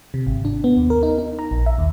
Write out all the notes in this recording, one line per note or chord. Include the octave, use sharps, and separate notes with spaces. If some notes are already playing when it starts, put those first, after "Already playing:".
C3
G#1
D4
B3
D#2
A#4
D#4
D#4
A#5
A#1
E5
D#2